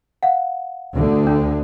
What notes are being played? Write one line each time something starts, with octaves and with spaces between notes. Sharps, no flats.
F5 F#5
D2 D3
D4